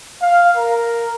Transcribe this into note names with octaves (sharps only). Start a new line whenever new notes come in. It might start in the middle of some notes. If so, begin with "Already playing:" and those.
F5
A#4